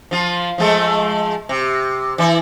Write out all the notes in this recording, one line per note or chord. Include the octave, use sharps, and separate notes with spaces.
F3 F4
F3 G#3 A3
C3
E3 E4